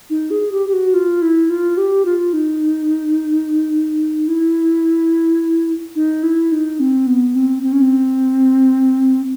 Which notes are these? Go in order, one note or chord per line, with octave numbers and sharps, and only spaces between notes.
D#4
G#4
G4
G4
F#4
F4
E4
F4
G4
F4
D#4
E4
D#4
E4
D#4
C4
B3
C4
C4
C#4
C4